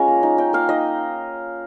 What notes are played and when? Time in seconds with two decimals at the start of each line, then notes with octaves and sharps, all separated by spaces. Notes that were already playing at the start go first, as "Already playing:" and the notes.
Already playing: G#3 C#4 F4 G#5 A#5
0.08 A#3
0.23 D#4
0.38 D#4 G5
0.53 A#3 F5
0.69 D#4 D#5